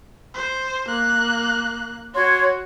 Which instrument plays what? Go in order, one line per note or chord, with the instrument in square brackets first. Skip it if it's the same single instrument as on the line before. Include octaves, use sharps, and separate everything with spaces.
[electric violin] C5
A#3 F#6
[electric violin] F#4 [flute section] C#5 C6